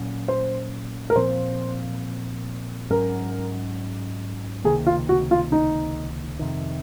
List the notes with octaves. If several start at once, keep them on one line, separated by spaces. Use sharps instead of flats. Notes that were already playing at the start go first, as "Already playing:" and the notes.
Already playing: A#2 F#3 C#4
C5
A#4
A#2 F3 C4 C5
G#2 F#3 C#4 A#4
C#2 C3 D#3 A#3 G#4
F4
F#4
F4
D#4
F2 C3 D#3